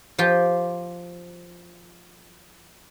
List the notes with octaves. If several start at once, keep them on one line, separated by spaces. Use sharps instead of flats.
F3 F4 G4 G5